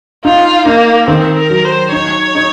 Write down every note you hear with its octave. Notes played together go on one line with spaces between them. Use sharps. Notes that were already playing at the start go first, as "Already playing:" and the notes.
D#4 F4
A#3 D#4
D#3 C4
A#4
F#3
C5
D#4 C#5
D#4